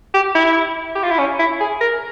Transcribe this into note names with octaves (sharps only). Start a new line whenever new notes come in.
G4
E4
G4
F4
E4
C#4
E4
G#4
A#4